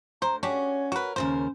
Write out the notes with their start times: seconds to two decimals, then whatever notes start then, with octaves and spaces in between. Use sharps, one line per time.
0.22 D2 C5 A#5
0.43 C#4 D4 F#4 G4 C#5
0.92 F#4 A#4 B4
1.16 D#2 C#3 A#4 C5